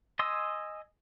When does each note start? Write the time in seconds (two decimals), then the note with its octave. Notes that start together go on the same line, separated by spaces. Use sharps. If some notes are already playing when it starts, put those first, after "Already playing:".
0.19 D#5 G#5 C6 D#6 E6